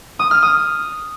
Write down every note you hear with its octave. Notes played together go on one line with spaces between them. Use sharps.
D#6
F6
D#6